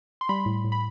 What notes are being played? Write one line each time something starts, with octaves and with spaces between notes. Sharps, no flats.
C6
G3 B5
A2
A2
B5